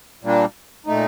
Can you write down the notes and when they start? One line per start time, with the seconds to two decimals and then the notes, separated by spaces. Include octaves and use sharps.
0.23 A#2 G3 A#3 D4
0.86 A#2 A3 D#4